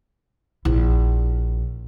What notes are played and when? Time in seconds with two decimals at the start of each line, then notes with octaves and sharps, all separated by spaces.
0.65 A#1 E4